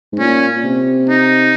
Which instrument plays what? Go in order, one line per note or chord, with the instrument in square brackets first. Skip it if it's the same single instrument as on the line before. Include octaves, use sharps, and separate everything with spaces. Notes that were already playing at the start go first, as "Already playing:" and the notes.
[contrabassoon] G#2
[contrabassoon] A#2 [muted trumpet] C#4
[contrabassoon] C3
[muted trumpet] D#4